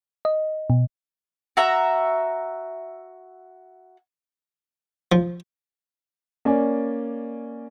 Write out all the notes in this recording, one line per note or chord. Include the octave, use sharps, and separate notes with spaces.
D#5
B2
F#4 E5 A#5
F3
A#3 C#4 D5 G#5